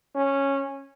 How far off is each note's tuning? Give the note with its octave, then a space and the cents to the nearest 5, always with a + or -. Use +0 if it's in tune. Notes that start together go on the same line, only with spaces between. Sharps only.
C#4 -10